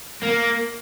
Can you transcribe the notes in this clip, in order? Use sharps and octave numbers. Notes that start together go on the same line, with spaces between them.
A#3